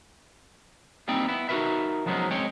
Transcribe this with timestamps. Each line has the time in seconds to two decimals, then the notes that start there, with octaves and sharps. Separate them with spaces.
1.08 G3 A#3 C4 D#4 G5
1.28 B3 E4
1.49 D#4 F#4 G4 A#4 B4 E5
2.06 F3 F#3 G#3 B3 C#4 D#4
2.30 G#3 C4 C#5 G5